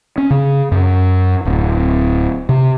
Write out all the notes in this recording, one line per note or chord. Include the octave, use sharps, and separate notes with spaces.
C#4
C#3
F#2
D1
C3